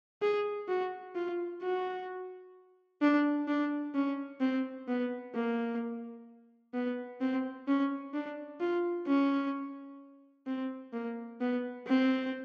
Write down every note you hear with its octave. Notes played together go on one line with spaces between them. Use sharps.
G#4
F#4
F4
F#4
D4
D4
C#4
C4
B3
A#3
B3
C4
C#4
D4
F4
C#4
C4
A#3
B3
C4